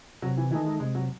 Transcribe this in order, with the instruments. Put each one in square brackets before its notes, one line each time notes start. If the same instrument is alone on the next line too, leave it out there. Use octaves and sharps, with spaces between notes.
[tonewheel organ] C3 [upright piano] F#3
[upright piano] E3
[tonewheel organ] D#3 [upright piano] E3
[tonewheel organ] A3 D#4
[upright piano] G#3
[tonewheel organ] C3 [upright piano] G#3
[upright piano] F#3